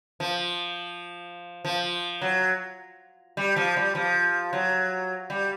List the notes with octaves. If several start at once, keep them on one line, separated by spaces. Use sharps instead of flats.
F3
F3
F#3
G3
F3
G3
F3
F#3
G3